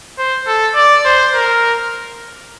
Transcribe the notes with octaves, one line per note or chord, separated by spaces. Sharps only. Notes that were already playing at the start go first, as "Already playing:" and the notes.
C5
A4
D5
C5
A#4